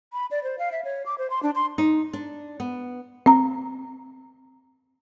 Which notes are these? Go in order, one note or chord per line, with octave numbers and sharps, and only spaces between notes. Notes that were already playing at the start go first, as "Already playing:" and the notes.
B5
D5
C5
F5
E5
C#5
D6
C5
C6
D4
C6
D#4
D4
B3
C4 A#5